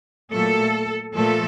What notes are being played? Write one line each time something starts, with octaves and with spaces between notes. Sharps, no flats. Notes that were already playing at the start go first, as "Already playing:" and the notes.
A#2 F#3 A3 A4
A#2 F3 A3 A4